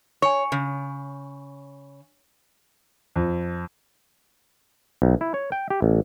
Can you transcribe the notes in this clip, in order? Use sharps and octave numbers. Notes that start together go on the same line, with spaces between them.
C#5 G#5 C#6
C#3
F2
B1
E4
C#5
G5
G4
A1